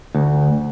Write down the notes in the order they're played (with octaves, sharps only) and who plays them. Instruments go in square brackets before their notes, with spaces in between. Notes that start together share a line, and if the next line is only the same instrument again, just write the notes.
[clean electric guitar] D2